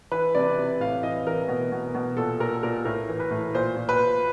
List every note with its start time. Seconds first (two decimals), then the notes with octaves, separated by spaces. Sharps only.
0.12 E3 B4
0.35 C3 D5
0.58 C3
0.80 A2 F5
1.03 E3 D#5
1.27 E3 A#4
1.48 B2
1.72 B2
1.95 B2
2.17 A#2 A4
2.40 A#2 A#4
2.63 A#2 A#4
2.85 A2 A#4
3.09 E3
3.20 B4
3.31 A2
3.54 A#2 C5
3.77 A#2
3.89 B4
3.99 A#2